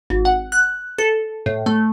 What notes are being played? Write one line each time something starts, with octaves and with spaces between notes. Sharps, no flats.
G#1
F#5
F#6
A4
A2
A3